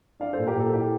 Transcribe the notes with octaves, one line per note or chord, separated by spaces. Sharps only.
D4 D5 F5
A4 C5
A#2
G4 A#4
A#2 A4
E4 G4